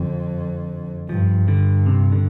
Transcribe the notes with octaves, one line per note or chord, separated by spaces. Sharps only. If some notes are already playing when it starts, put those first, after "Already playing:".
Already playing: F2 D3
G2 F3
D3
C3
D3